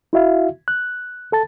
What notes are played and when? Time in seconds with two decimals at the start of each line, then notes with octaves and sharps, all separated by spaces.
0.13 E4 F#4 E5 F5
0.68 F#6
1.32 A4 A5 A6